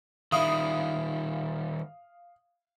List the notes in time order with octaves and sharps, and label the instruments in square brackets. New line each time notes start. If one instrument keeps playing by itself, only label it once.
[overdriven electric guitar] D#3 G3 [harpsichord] E4 [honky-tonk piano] F5 D#6